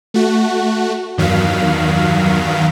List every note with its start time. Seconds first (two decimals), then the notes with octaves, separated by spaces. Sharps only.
0.14 A3 F#4
1.18 E2 G2 D#3 F#3 F5 B6